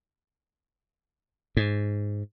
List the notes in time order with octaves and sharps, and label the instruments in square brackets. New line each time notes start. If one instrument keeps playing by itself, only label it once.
[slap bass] G#2